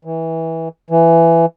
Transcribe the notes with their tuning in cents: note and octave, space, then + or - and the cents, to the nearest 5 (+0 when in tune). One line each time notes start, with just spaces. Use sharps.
E3 -20
E3 +15